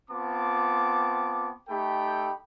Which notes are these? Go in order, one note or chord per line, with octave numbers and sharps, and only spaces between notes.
B3 C4 F4 A5 D6
A3 D#4 G4 A4 G5 B5